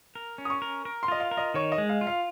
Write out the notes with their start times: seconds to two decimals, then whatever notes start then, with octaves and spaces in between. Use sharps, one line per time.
0.15 A#4
0.38 C#4
0.45 D#6
0.50 C#6
0.62 A#4
0.85 A#4
1.03 C6
1.08 F4 D#5
1.20 F5
1.31 A#4
1.37 D#5
1.54 D#3 C#5
1.72 D#5
1.78 G#3
1.89 F5
2.01 F4
2.07 F5